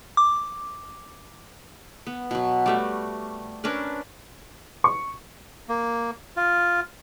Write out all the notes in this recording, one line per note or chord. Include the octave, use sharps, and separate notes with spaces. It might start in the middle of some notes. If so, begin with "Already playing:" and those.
D6
B3
B2 F#3
G3 A3 F#4
C#4 D4 A#4 B4
C#6
A#3
F4